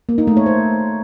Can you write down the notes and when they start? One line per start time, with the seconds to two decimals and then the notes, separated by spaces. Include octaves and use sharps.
0.09 A#3
0.18 D#4
0.27 A3
0.37 C#5
0.46 C5